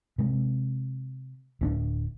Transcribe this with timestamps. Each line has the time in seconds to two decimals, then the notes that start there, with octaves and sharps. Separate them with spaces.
0.18 C3 G#3
1.61 D1 C#4 D4